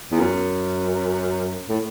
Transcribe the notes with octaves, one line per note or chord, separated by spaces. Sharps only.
E2
F#2
A2